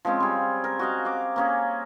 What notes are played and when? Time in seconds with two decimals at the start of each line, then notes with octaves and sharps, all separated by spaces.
0.05 F3 G#3 C4 C#4
0.20 G3 G#4
0.64 A#4
0.79 F#4 D#5 F5
1.05 F5 D6
1.36 A#3 C#4 G#4